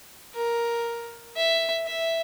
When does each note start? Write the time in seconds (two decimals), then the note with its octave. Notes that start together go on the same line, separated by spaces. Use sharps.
0.35 A#4
1.36 E5
1.86 E5